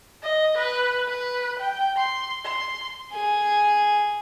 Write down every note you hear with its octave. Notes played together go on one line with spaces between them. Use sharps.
D#5
B4
B4
G5
C6
C6
G#4